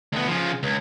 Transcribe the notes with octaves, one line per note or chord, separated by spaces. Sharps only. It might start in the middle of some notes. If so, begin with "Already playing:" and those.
D2 B3
C#3 F3
C#2